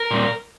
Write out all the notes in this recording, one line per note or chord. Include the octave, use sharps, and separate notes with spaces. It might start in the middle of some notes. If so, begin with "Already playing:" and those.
Already playing: A#4
A#2 G3